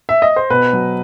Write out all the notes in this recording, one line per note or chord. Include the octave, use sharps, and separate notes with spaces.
E5
D#5
C5
B2 B4
F#3